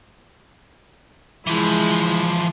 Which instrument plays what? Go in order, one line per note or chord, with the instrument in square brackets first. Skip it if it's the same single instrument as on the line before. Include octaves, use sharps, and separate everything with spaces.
[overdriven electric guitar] E3 F3 [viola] G#3 E4